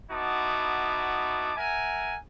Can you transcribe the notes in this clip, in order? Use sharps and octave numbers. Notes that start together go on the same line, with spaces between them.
B3 D#4 E4 F#4 A5 D6
A#4 E5 F#5 G#5